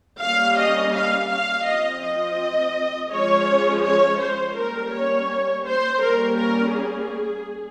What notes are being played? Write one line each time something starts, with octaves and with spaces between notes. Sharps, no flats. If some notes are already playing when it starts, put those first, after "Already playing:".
G3 A#3 C#4 F5
D#5
F5
F5
F3 C4 D#5
D#5
F3 G#3 C#4 C#5
C#5
C5
G3 A#3 C#4 A#4
C#5
C5
G3 A#3 C#4 A#4
A#4
G#4